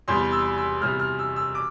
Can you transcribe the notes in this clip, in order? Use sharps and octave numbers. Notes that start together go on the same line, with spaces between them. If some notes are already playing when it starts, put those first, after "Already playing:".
E2 C3 G3 C6
E6
E6
E2 C3 G3 F6
F6
E6
E6
D6